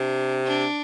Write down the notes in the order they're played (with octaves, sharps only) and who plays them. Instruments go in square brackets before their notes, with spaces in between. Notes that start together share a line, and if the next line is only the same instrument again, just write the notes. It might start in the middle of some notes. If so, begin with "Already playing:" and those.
Already playing: [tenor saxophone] C3 [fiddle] D4
[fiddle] D4